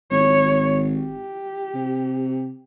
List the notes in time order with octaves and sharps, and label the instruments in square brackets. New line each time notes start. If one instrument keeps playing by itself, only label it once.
[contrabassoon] G#1 [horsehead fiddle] C#5
[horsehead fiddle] G4
[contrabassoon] C3